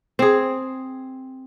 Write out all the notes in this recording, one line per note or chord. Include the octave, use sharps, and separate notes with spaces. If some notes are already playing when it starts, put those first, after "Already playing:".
C4 G#4